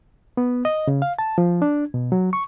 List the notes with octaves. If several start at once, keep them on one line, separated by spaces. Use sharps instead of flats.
B3
D#5
C#3
F5
A5
F3
D4
B2
F#3
C#6